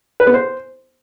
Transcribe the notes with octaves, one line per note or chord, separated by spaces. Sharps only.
B4
B3
C5